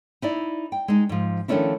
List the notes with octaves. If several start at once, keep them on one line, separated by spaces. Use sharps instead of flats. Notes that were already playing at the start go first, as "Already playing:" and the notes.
D#4 E4 D5
G5
G#3 D#4
G#2 F3
D#3 F3 A3 C#4 D4 E4